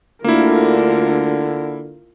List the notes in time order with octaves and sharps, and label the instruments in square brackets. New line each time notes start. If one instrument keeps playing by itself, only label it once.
[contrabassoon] D2 [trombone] D3 [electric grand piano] A#3 E4 [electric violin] F4 A#4